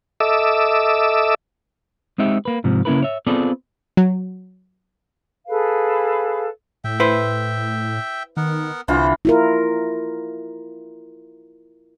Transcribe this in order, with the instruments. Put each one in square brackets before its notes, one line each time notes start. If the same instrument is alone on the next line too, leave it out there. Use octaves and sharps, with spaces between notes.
[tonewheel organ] A4 D#5 E5 D6 E6
[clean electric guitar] G#3 C4 D#4 G4 E5
A#3 B4
G#2 C3 F3
C#3 A#3 C#4 E4 A#4 B4
C#5 E5
B3 C4 F4 G#4 A4 D5
[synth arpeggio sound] F#3
[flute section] G#4 A4 B4 F5
[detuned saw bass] A2 [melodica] E5 G5
[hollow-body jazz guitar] E4 B4 C5
[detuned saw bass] D#3 [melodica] B3 A#4 F#5
[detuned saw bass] C2 [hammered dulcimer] D3 E3 F4 [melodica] C5
[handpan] E4 F4 A#4